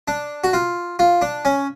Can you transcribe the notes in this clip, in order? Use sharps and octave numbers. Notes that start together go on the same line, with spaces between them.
D4
F#4
F4
F4
D4
C#4